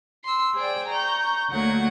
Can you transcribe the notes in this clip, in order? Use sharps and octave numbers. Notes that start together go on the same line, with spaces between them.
C6 E6
G#4 C5 D5 G5
A#5 C#6 G6
D2 F#3 A#3 F#5 G#6